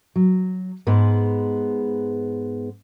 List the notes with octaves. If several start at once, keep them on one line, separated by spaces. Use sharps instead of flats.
F#3
G#2 G#3 B3 B4